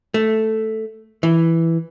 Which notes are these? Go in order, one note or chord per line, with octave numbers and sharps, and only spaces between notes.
A3
E3